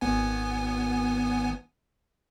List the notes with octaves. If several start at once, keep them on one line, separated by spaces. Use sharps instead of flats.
G#1 B3 G#5